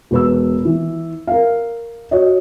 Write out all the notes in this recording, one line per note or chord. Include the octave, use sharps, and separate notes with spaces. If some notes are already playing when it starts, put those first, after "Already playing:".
E1 B4 E6
E3
A#4 F5
F#4 C#5 D#5